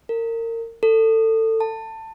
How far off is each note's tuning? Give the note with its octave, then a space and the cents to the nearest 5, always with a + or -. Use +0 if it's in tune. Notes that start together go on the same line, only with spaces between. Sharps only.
A#4 -30
A4 +25
A5 +20